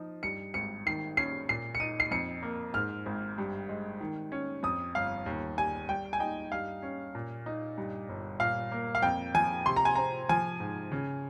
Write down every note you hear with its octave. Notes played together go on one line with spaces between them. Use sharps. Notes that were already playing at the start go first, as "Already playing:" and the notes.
Already playing: F3 D#4
G2 C#7
G#1 C#7
D#3 C7
C#4 C7
A#2 C7
C#7
D#4 D#7
C7
F2 C#7
A#3
G#2 F6
G#1
G2
G#3
D#3
C#4
F2 D#6
G1 F5
D#2
G3 G#5
G3 G5
G#5
D#4 G5
G2 F5
C#4
A#2
D#4
G2
G1
A#2 F5
A#3
F5
F2 G5
F3 G#5
C3 C6
A#5
G#5
C4 A#5
F3 G#5
G#2
C#3